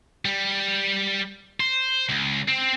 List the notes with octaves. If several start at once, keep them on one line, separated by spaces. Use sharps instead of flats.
G3
C5
C#2
C4